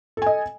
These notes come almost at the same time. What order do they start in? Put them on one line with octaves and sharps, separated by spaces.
A4 G#5 D#5